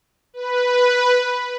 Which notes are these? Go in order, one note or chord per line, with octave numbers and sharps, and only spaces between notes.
B4